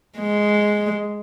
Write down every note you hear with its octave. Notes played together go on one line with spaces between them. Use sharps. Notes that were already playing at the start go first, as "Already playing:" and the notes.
G#3